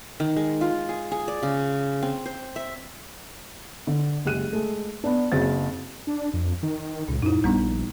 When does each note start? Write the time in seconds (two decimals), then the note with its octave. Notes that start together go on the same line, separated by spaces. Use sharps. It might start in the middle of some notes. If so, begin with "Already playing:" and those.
0.20 D#3
0.36 G#3
0.61 F4
0.89 G#4
1.12 G#4
1.28 D5
1.43 C#3
2.02 C4
2.26 C5
2.56 E5
3.87 D3
4.25 F#1 G#3 G4 F#6 D#7
4.53 G#3 A3
5.04 B3 D4
5.32 F#1 F#3 C4 A6
6.07 D4
6.34 F2
6.63 D#3
7.08 C#2 A#2
7.22 F#2 D#4 E4
7.44 A#1 G3 B3 D4